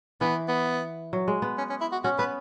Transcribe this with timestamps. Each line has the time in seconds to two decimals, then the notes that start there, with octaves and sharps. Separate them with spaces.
0.21 E3 B3
0.48 B3
1.13 F#3
1.28 G#3
1.42 B3
1.58 C#4
1.69 C#4
1.81 E4
1.92 F#4
2.04 C#4 F#4
2.18 B3 B4